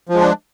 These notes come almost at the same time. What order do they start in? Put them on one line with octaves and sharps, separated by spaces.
F3 G#3 D4